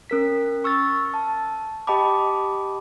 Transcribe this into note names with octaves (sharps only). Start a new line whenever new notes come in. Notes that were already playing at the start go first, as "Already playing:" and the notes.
C#4 A#4 B6
C#6 E6 F6 A6
A5
G4 D#5 G5 A5 B5 D6